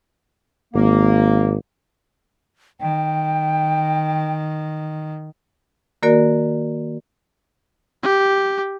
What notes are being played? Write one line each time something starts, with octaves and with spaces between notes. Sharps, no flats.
G#1 A#3
D#3 G5
D#3 A#3 F#4 A#4 D5
G4